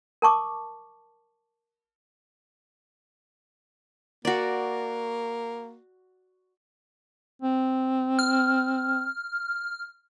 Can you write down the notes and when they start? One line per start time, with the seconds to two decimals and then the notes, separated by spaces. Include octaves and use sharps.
0.22 A#4 A5 C#6 D6
4.25 A#3 F#4 D5
7.42 C4
8.19 F6